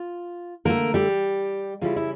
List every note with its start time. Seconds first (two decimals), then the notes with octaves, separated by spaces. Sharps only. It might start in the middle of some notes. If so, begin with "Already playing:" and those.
Already playing: F4
0.65 D3 F3 A#3 A#4
0.70 A3
0.94 G3 G4
1.81 C#3 G3 C#4 E4 F4
1.96 E4